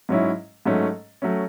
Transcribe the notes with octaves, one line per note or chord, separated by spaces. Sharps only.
G#2 F#3 C#4 E4
G#2 F#3 A3 C#4
F#3 A3 C#4